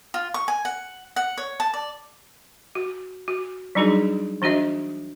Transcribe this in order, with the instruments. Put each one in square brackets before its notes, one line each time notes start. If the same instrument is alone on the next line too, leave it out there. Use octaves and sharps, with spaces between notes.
[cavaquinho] F4
C#6
G#5
F#5
F#5
C#5
A5
D5
[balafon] F#4
F#4
F#3 G3 D4 D#4 F#4 G#4
E3 D4 F#4 D#5 E5